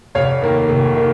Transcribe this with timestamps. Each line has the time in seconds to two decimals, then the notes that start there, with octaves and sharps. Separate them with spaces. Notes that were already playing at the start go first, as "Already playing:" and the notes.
0.15 F1 C#5 F5
0.42 D#2 D#3 A#3
0.69 F1
0.96 D#3 A#3